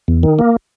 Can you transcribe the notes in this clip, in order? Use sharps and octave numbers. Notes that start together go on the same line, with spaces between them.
E2
D#3
A#3